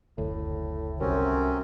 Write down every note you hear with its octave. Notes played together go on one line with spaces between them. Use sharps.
F#1 D2 A2
C2 F#2 C3 C4 C#4